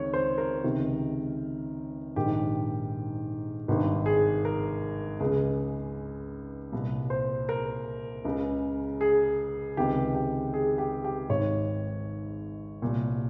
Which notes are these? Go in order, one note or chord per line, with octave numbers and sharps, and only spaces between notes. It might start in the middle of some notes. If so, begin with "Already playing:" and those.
Already playing: C#2 C3 D#3 C#5
C5
A#4
C#2 C3 D#3
A#1 G#2 D#3 G4
G#1 G2 D#3
G#4
A#4
C#2 C#3 G#4
C2 A#2
C5
A#4
C#2 C#3
G#4
C#2 C3 D#3 G4
G4
G#4
G4
G4
G#1 G#2 D#3 C#5
C2 A#2